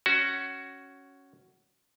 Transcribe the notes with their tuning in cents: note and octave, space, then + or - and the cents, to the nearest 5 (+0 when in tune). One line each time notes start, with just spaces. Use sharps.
C#4 +0 F#4 +10